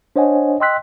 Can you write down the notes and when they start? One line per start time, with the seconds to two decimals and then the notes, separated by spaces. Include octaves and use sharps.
0.16 D4 C5 C#5 D#5 F#5 G#5
0.60 D#5 G5 C6 E6 F#6 B6